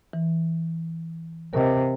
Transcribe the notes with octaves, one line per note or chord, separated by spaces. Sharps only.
E3
C3 A#4 D#5